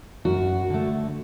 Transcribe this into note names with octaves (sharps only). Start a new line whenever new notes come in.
F#2 F#4
D3 A3